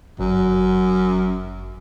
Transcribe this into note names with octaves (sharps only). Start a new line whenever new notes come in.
G1 F#2